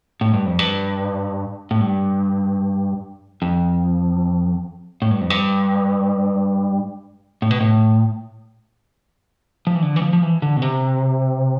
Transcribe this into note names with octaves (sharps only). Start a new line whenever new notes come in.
A2
G2
F2
G2
A2
G2
F2
A2
G2
F2
G2
A2
B2
A2
F3
E3
D3
E3
F3
F3
E3
D3
B2
C3